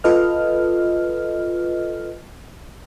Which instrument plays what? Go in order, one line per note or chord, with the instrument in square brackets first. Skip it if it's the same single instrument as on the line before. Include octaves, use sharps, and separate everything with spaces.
[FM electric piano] F4 A4 B4 D#5 F6